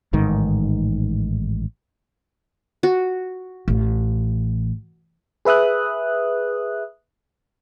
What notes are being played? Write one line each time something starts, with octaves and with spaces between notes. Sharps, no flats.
A1 G#2 D#3
F#4
A1
G#4 B4 E5 D#6 F#6